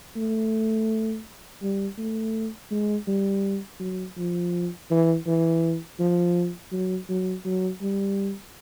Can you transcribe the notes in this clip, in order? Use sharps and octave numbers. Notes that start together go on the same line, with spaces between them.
A3
G3
A3
G#3
G3
F#3
F3
E3
E3
F3
F#3
F#3
F#3
G3